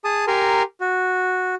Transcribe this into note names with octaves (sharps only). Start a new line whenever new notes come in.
G#4 A5 D#6
G4 A#4 G#5 A#5 C6
F#4